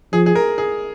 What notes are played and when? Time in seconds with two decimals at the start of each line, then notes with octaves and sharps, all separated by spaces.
0.13 F3 G#4
0.26 G#4
0.35 A#4
0.58 G#4